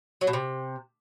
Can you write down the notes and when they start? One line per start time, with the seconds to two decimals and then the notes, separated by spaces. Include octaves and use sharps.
0.21 F#3
0.27 B2
0.33 C3